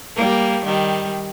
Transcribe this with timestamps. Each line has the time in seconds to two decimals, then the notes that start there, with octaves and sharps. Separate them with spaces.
0.16 G3 A#3
0.65 D#3 G3